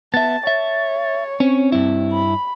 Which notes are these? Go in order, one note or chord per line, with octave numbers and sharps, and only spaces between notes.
B3 E5 A5 A6
C#5 E5
C4 C#4
G2 E4
B5